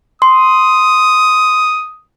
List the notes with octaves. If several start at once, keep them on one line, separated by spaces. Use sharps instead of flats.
C6 D#6